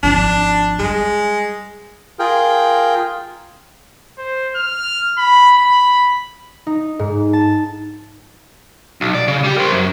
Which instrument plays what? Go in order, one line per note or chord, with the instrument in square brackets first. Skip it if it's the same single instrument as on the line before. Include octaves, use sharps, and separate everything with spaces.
[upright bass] G#1 F3 [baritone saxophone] D4
[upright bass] G3 [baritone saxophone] G#3
[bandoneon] F4 G#4 A#4 G5
[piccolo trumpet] C5
F6
B5
B5
[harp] D#4
G#2
A5
[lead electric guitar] B1
D5
C#3
G3 G4
A#4 C5
F#2